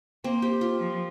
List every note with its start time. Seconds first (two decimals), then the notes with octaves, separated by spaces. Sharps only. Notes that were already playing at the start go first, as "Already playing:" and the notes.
0.24 A#3 C4
0.42 G4
0.61 F4
0.79 F3